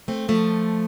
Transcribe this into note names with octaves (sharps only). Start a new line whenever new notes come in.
A3 C4
F3 A3